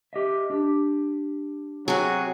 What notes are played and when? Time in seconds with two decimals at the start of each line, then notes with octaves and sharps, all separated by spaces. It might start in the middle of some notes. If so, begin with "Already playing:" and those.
0.13 G4 D#5 E5
0.50 D4 G4
1.88 C3 F#3 G#4